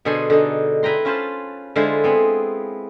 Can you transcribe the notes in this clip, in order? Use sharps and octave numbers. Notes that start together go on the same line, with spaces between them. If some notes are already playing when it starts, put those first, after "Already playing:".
B2 D3 G#4 A4 C5 G#5
D3 D#4
E4 B4 G5 A#5 C6
C#4 F4 B4 C5 A5
D3 G#3 E4 F4 C5
B3 C4 G#4